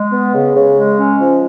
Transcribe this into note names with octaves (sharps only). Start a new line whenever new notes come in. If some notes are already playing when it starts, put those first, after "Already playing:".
Already playing: G#3
B3
C#3
C#3
G#3
C#4
F3